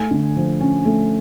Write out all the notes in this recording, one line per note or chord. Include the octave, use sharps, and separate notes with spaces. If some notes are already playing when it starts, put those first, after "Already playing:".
Already playing: A3 G#5
D3
F3
C#4
A3